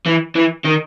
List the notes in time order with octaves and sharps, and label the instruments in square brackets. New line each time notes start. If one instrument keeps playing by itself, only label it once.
[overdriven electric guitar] E3
E3
D#3